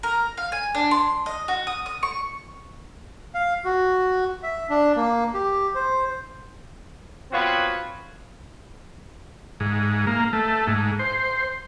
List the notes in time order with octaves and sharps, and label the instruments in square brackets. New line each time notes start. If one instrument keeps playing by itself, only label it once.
[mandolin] A#4
F5
G#5
D4
C6
D#5
F#4
D#6
D#6
C#6
[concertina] F5
F#4
E5
D4
A#3
G4
C5
[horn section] B3 C4 F4 F#4 B4 C#5
[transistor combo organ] G#2
A#3
A3
G#2
C5